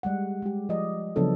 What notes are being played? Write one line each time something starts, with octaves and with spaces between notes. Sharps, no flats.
G3 G#3 F#5
G#3 G4
F3 D5 D#5
C#3 F3 F#3 B3 D4 A4